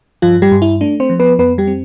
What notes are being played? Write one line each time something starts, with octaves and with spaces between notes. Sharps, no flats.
G2 F3 F4
G3 G4
G2
E4
A3 D4
C4 C5
F3
B3 B4
F2 B3 B4
G3 G4
C4